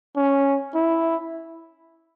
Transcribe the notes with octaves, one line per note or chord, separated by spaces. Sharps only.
C#4
E4